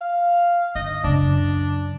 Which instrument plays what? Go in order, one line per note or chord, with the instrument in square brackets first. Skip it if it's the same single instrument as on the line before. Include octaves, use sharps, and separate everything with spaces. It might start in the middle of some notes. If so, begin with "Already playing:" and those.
[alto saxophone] F5
[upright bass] G1 [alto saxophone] D#5
[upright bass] F#2 C#3 [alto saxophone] D4